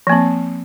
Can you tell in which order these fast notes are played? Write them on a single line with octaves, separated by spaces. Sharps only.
F3 A#3 C4